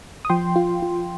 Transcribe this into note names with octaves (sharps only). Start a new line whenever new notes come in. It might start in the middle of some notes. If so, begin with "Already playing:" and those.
D#6
F3 G5 C6
F4
F4